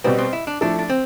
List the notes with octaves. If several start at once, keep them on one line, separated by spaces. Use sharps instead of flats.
B2 G3 B3 C4
C4
E4
D4
F3 A3 D4 E4 A4
D4
C4